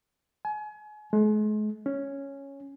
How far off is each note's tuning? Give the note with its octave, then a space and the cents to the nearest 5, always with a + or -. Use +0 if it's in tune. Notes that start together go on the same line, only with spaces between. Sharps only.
G#5 +35
G#3 +40
C#4 +0